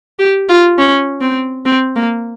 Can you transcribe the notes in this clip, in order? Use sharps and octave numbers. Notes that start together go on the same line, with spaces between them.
G4
F4
C#4
C4
C4
A#3